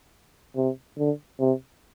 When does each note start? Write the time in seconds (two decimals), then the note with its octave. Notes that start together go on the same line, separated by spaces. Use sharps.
0.56 C3
0.98 D3
1.40 C3